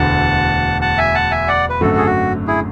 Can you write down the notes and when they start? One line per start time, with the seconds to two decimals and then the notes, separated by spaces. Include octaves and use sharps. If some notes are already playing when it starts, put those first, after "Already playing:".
Already playing: E1 D2 D3 A3 F#5 A5
0.82 F#5 A5
0.98 E5 G#5
1.14 F#5 A5
1.31 E5 G#5
1.48 D5 F#5
1.70 B4
1.81 G#1 F#2 D3 A3 F#4 A4
1.98 G#4
2.06 F#4
2.47 E4 G#4